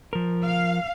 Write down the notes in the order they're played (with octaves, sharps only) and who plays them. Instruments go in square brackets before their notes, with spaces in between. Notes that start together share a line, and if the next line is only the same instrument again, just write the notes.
[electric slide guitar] F3 A#4
[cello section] F5